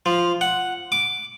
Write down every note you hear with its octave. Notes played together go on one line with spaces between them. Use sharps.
F3
F#5
D6